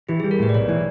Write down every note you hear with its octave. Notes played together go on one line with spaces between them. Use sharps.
E3 G4
G3 G#4
A#4
A2 B4
D5
B1 C#5
E3